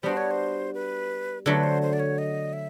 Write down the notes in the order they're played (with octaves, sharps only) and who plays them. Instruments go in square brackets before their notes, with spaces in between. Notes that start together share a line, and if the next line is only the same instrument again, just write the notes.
[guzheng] G3 B3 D4 F#4 [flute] C5
[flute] C#5
C5
B4
[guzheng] D3 F#3 A3 [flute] B4
[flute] C5
C5
D5
C#5
D#5
E5